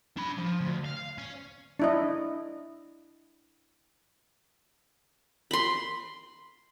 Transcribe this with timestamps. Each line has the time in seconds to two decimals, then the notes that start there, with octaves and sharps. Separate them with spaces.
0.17 D4 B5
0.38 F3
0.61 D2
0.85 F5
1.18 C#4
1.79 D4 E4 D#5
5.51 B5 C6